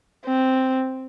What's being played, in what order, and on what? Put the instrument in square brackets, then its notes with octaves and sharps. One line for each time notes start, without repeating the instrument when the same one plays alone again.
[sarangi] C4